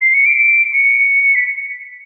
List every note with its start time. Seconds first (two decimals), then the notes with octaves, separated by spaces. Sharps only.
0.01 C7
0.14 C#7
0.26 D7
0.37 D7
0.73 C#7
1.35 B6